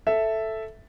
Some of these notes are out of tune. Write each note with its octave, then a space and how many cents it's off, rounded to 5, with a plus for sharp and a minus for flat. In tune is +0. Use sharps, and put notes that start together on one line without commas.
A4 +0 E5 +0